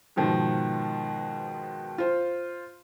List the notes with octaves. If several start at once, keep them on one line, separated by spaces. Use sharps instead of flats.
G#2 B2 D#3 F3
F4 C5